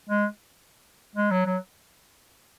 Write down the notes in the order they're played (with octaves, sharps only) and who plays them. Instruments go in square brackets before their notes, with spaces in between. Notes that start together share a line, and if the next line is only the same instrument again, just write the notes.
[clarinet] G#3
G#3
F#3
F#3